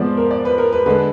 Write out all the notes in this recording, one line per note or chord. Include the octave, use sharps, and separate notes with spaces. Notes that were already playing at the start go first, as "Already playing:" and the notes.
Already playing: G#2 F3 G#3 B3 D5
A#4
D5
B4
A#4
B4
D3 G#3 D4 B4